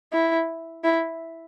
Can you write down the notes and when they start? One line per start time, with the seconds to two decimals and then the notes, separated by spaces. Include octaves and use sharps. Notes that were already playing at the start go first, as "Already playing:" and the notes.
0.13 E4
0.84 E4